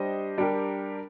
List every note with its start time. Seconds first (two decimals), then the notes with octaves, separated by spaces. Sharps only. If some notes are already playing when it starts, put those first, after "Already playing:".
Already playing: G3 D4 G4 C5 D#5
0.38 G3 D4 G4 A#4